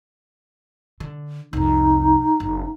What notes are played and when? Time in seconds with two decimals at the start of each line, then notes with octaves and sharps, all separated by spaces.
1.00 D3
1.53 C2 F2 D#4
2.40 F#1